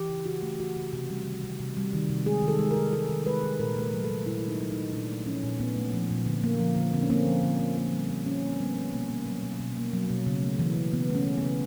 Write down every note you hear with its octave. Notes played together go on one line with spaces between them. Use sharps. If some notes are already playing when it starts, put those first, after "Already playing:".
Already playing: E3 G4
C#3
C#3 F#4
A3
E3 F#4
C#3
C3
G3
D#3
C3
C3
G3
D#3
C3
G#3 G#4
D#3
A4
G#3
A#4
D#3
G#3 A4
D#3
G#3 B4
D#3
A#2 A#4
A3
A#4
F#3
A4
A#2
A#2 E4
A3 E4
D#4
F#3
D#4
A#2
A#2 D4
A3
F3 C#4
A#2
A#2 B3
A3
F3
A#2
D3
A#3
F3
D3
D3 C4
C#4
A#3 C4
F3
D3
D3
A#3
G3
D3
D3 C#4
A#3
C4
G3 B3
D3
B2 A#3
A#3
F#3
B2
B2
A#3
F#3
B2
C#3
A3
E3
C#3
C#3 B3
A3 C#4
E3
B3
C#3